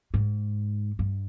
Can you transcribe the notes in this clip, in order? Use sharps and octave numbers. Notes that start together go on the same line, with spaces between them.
G#2
G2